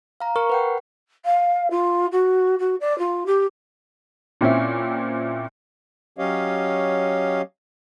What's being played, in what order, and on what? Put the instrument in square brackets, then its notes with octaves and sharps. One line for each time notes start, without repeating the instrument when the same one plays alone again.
[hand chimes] F5 A#5
[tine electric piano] A#4 [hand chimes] C#6
[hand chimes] B4 F#5 G5
[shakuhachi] F5
F4
F#4
F#4
D5
F4
G4
[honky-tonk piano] A#2 C4 C#4 E4
[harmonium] F#3 C#4 G4 C#5 D#5 F5